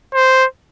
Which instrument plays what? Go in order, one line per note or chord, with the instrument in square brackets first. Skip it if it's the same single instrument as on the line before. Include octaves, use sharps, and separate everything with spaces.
[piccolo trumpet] C5